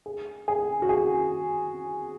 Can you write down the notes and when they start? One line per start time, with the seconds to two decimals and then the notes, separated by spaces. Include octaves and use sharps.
0.06 G#4
0.48 G#4
0.82 F#4
0.89 G#4